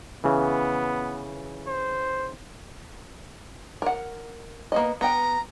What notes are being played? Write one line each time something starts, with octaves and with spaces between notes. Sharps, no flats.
C#3 E3 B3
C5
A#4 F#5
A#3 B3 D#5
B3 G5 A#5